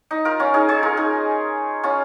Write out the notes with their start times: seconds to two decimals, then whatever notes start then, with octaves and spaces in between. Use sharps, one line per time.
0.11 D#4
0.25 F4 A#4
0.40 C#4 F4
0.54 D#4 G#4
0.69 G#4 C#5
0.83 F4 A#4
0.97 D#4 G#4
1.83 C#4 F4